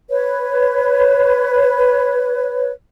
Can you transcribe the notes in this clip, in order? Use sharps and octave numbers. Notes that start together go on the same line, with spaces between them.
B4 C#5